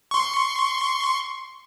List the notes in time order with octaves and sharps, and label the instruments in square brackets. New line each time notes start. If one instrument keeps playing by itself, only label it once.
[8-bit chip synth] C6 C#6